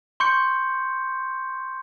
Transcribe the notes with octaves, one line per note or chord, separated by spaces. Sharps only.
C6 C#6 G6 C#7